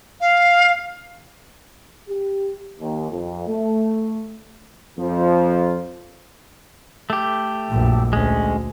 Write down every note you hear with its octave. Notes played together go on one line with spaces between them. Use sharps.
F5
G4
D#2
F2
A3
F2 F3
A3 G4
A#1 F#2
D2 G#3 C#4